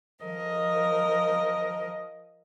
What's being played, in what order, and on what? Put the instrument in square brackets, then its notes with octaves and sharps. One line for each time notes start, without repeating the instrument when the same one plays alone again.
[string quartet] F3 A#4 D#5